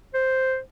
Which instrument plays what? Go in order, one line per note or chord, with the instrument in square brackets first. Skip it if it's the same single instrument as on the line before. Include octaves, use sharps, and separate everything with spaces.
[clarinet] C5